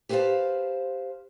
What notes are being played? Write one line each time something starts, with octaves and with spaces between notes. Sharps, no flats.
G4 B4 C5 D5 F5 A5